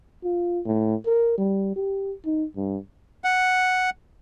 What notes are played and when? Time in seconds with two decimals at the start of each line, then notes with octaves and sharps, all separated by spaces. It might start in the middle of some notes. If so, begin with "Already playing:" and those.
0.24 F4
0.65 A2
1.06 A#4
1.37 G3
1.76 G4
2.25 D#4
2.57 G2
3.24 F#5